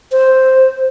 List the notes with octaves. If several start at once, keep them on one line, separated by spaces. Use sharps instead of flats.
C5